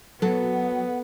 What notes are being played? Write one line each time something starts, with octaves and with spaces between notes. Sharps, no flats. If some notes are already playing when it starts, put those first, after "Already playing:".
F#3 B3 A4 F#5